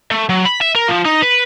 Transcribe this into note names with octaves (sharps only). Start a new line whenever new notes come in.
A3
F#3
B5
E5
A#4
F3
D#4
B4